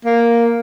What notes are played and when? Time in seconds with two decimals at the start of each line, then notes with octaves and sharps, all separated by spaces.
0.05 A#3